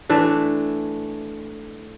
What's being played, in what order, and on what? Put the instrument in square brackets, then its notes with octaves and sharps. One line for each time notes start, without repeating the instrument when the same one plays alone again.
[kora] E3 A3 D4